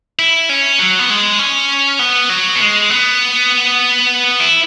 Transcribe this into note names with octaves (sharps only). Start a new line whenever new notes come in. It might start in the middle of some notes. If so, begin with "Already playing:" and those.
E4
C#4
F#3
B3
G#3
C#4
B3
F#3
B3
G#3
B3
E4